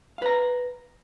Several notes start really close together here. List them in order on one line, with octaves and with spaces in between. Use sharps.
F5 B4 A#5